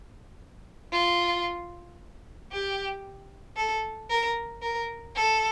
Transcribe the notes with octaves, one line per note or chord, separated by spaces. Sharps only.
F4
G4
A4
A#4
A#4
A4